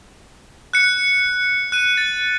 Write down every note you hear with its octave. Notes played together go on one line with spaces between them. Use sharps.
F#6 C#7
F#6 D#7
A6